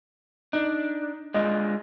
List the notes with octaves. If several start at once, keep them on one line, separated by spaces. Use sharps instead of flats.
D4 D#4
G#3 D4 F4 D#5